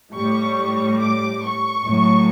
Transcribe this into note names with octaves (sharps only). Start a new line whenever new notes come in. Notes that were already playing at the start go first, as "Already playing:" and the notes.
A2 G3 C#6
D6
C#6
A2 F#3